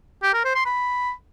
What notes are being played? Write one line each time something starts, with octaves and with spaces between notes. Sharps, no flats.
G4
A#4
C5
C6
B5